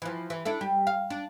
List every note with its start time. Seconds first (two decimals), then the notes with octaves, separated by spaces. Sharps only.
0.02 E3 F3
0.30 E3
0.45 D4 E4 A4
0.61 G3
0.87 F5
1.10 D4